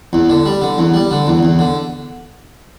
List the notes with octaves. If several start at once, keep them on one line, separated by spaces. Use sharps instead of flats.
E2
D3
G3
D3
E2
G3
D3
E2
E2
D3